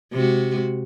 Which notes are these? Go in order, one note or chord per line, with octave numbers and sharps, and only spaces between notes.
C3 G#3 F#4